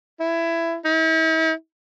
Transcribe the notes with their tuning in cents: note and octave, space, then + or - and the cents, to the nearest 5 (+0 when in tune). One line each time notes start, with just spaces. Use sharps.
E4 +15
E4 -45